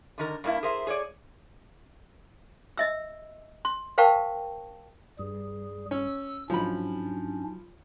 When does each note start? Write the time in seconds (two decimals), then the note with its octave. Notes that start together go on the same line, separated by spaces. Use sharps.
0.18 D3 D#3 A#4
0.44 G2 A#3 E4
0.63 G#4 A#4 C5 E5
0.87 G#4 C#5 D5
2.78 D#5 E5 E6
3.65 C6
3.98 A#4 C5 F5 G5 A5 C#6
5.19 G2 G3 G#4
5.91 C#4 E6
6.50 G#2 F3 F#3 C#4 D4 B5